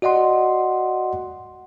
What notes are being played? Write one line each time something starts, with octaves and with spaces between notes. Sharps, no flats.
F#4 D5 D#5 F#5 C6